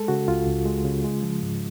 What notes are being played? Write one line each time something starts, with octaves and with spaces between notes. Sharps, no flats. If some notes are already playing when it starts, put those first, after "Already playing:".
Already playing: G#3 A4
C#3 F#4
C#2 F4
C#2
G#3
C#3
G#3
F3
G#2